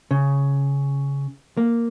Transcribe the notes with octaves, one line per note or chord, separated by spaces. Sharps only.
C#3
A#3